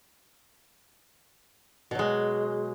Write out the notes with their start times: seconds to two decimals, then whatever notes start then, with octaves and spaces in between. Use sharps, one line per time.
1.91 B2
1.95 F#3
1.99 G#3